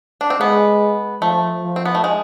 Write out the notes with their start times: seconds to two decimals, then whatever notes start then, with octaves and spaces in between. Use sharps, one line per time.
0.21 D4
0.30 C4
0.41 G#3 B3
1.22 F3 A3
1.63 F3
1.76 C4
1.85 B3
1.95 A3
2.04 G#3